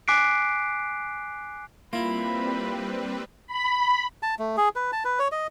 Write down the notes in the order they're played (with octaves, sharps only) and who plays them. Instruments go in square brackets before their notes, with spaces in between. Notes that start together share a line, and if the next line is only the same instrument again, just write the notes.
[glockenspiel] G#5 D6 F#6 B6 C7 D7
[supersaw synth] G3 C4 B4 [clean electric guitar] A#3 E4 [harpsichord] F4 [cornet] B5
[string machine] B5
[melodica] A5
A3
G#4
B4
A5
B4
C#5
D#5